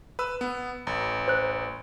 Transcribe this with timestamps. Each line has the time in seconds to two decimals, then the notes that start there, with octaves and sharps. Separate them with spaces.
0.19 B4 E6
0.41 B3
0.87 A1
1.28 C5 F#6